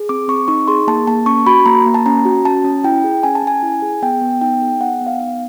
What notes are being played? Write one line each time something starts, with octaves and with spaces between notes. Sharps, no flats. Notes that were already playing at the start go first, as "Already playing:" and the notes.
Already playing: G#4
C4 D6
C4 C#6
D#4 C#6
G#4 C6
A#3 A5
A#3 A5
C#4 C#6
F#4 B5
A#3 A#5
A#3
A5
C#4 A#5
F#4
C#4 A5
C#4
E4 G5
G#4
C#4 G#5
A5
C#4 G#5
E4
G#4
B3 G5
B3
D#4 G5
G#4
B3 F#5
B3
F5
D#4